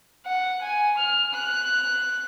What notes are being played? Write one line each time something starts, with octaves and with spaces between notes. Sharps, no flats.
F#5
G#5
F6
F#6